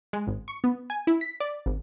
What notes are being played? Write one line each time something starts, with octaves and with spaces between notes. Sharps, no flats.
G#3
G#1
C#6
B3
G#5
E4
B6
D5
G#1